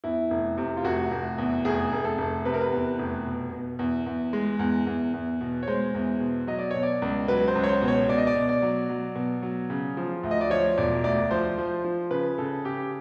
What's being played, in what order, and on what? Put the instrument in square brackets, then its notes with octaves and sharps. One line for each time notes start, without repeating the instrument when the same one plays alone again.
[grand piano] E2 E4
F1
C3
F4
F1 F#4
F1
E2
F1 G#4
F1
A4
F1
C3 B4
A#4
B4
E2
F1
B2
B2
E2
E2
G#3
E2
E2
E2
B2
C#5
G#3 C5
E2
B2
F#3 D#5
D5
B2 C#5
D5
C#2
F#3 B4
C5
C#2
C#5
C5
B2
C#5
B2 D5
D#5
D5
B2
D5
F#3
F#3
B2
F#3
C#3
F3
D2
D#5
D5
F3 C#5
E1 D5
D2 D5
F3 C5
F3
F3
C#3 B4
C#3 A4
C#3 G4